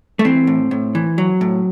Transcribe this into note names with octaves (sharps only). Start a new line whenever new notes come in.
A3
E3 C4
A2
A2
E3
F#3
A2